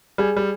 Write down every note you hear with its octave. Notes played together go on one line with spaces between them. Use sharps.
G3 G#4
G3